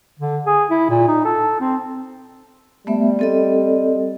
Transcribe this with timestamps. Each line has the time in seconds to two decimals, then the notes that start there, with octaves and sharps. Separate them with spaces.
0.19 D3
0.47 G#4
0.71 E4
0.90 A#2
1.08 D#4
1.25 A4
1.60 C4
2.87 G3 A3 B3 E5
3.19 C4 A4 D#5